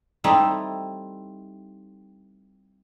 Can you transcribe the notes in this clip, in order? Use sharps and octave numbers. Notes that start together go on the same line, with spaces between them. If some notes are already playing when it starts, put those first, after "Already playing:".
G3 A3 C4 D#4 E4 G4